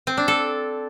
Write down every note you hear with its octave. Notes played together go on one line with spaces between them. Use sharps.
C4
D4
A4